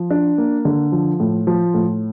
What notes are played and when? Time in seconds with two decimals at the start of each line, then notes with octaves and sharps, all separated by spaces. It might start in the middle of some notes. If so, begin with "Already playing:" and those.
Already playing: F3
0.11 D4
0.38 A#3
0.65 D3
0.92 F3
1.20 A2
1.47 F3
1.74 A2